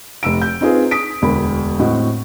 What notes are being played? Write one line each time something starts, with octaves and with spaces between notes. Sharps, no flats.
F1 E6 D7
G6
C4 D#4 F4 G#4 B4
D#6 B6 D7
E1 D2 A#4 B5
A2 C4 F#4 D#5